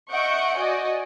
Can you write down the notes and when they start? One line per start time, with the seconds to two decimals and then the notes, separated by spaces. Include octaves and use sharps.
0.10 D#5 E5 F#5 C#6 G6 D7
0.57 F#4 D5 D#5 G#5